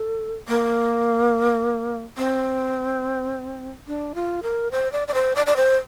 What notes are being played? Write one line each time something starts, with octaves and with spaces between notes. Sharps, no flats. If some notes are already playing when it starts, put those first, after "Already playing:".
Already playing: A4
A#3
C4
D4
F4
A#4
C5
D5
D5
C5
D5
D5
C5